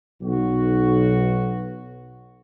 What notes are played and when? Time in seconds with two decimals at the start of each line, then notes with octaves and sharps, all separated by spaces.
0.22 B1 F#4